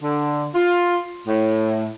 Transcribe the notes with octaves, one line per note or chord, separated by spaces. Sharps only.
D3
F4
A2